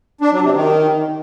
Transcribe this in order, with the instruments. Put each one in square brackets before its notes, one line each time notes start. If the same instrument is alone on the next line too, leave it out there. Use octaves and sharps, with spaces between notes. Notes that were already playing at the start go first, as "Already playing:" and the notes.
[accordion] D4
F#3
C3
D#3